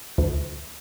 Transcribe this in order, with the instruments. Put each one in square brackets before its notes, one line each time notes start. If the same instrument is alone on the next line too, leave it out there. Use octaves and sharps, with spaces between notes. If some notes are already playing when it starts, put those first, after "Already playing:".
[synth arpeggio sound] D2